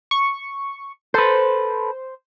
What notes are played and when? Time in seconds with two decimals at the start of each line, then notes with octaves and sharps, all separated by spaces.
0.11 C#6
1.14 A4 B4 C5